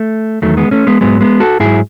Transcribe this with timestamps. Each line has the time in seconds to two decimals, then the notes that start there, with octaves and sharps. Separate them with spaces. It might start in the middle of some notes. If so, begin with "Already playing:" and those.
Already playing: A3
0.42 E2 D#3 F#3 A3
0.57 G#3 B3
0.71 A3 C#4
0.87 G#3 B3
1.01 G#2 F#3 G#3 B3
1.21 G#3 B3
1.40 F#4 A4
1.60 G#2 F#3 E4 G#4